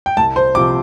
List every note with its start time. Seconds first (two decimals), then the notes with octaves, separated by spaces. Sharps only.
0.06 G5
0.17 C2 A5
0.36 C5
0.55 C3 F3 D6